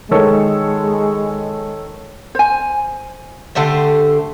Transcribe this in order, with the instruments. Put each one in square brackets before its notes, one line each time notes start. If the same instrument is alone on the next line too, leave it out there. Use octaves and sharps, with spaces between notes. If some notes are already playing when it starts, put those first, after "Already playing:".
[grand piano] D#3 A4 C#5 [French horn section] G#3
[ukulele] C5 G#5
[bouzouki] D3 A3 G4 C5